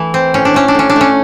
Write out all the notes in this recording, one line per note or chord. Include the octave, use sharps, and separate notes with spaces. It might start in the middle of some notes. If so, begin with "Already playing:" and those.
Already playing: E3 A3 E4
C4
A2 C#4
D4
A3 C#4
D4
A2 C#4
D4
A3
C#4